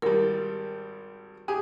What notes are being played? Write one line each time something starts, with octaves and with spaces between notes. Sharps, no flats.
G#1 G3 A#4
G4 G#4 G#5